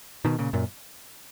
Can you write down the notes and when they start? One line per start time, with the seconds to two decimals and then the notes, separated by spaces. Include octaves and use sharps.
0.25 B2 D#3
0.38 A#2 C#3
0.53 F#2 A#2